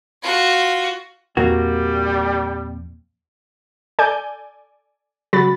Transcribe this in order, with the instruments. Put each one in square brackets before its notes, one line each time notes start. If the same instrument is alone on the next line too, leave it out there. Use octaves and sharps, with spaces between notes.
[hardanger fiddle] F4 F#4
[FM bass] E2 [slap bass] A#2 F3 C4 [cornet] G3 [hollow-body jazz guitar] A#3 F#4
[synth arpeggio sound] A4 D5 G#5 G6
C#3 F#3 F#4 B5 A6